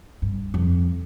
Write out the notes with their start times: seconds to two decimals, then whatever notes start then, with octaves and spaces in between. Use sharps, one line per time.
0.22 G2
0.54 F2